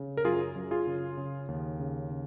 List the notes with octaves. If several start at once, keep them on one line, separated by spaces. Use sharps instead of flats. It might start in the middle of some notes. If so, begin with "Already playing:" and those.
Already playing: C#3
A#4
F#2 F4 G#4
F#2
F4 G#4
C#3
C#3
D#2
C#3
C#3